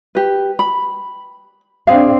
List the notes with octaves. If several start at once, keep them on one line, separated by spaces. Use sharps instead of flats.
G4 B4
B5
C4 D4 G#4 F5